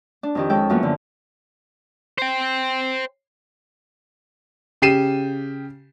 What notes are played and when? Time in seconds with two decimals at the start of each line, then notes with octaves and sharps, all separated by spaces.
0.23 D4
0.35 F2 D#3 G4
0.50 G#3 C#4 A4 G5
0.70 F#2 E3 F3 A#3 B3
0.83 D3
2.18 C5 G5
4.82 C#3 G4 C7 D#7 E7